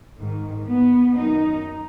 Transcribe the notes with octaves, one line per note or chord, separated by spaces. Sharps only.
G#2 D#3
B3
F#2 D#3 D#4